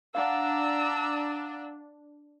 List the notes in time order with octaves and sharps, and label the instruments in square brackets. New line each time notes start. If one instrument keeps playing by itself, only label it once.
[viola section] D4 [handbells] F5 F#5 [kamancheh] A#5 E6